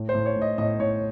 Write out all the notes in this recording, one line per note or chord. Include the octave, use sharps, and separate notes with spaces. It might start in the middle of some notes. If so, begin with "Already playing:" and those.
Already playing: A2
C5
A2
C#5
A2
D#5
A2 D#5
A2 C#5